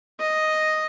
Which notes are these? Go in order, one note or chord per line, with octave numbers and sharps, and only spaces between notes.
D#5